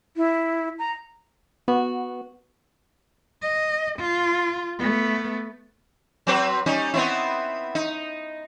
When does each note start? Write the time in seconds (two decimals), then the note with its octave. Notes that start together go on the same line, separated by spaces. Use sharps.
0.17 E4
0.79 A#5
1.68 B3 F#4
3.42 D#5
3.99 F4
4.79 A3 B3
6.27 F#3 C4 B4
6.66 G3 C#4 D#4
6.94 B3 C4 E4
7.75 D#4